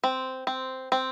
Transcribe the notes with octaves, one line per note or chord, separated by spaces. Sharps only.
C4
C4
C4